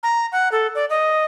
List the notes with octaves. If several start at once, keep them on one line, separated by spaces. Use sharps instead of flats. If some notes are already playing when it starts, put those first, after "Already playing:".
A#5
F#5
A4
D5
D#5